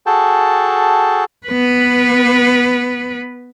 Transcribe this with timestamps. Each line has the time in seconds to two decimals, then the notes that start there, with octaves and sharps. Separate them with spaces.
0.06 F#4 G#4 A4 G5 A5
1.47 B3 B4